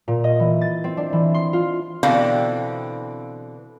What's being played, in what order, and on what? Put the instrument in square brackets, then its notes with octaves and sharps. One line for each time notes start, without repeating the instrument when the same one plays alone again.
[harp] A#2
D#5
E3
A6
C4
D4
E3
C6
F4
[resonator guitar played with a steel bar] B2 D3 E3 C4 F5 G5